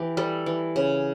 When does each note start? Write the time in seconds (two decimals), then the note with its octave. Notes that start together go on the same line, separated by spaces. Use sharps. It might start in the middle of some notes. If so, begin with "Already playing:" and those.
Already playing: E3 G4
0.17 G3 A4
0.46 E3
0.76 C#3